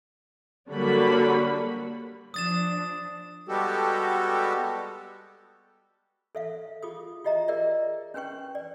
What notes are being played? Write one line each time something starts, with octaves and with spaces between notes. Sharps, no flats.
D3 F#3 G3 A#3 F#4 B5
F3 D4 D#6 A6 E7
G3 G#3 B3 F#4 G4 A4
A4 E5 F5
F4 G#4 D#6
F4 G4 D#5 E5 A#5
G#4 A#4 D5 E5
C#4 D4 B4 G5 C#6
D5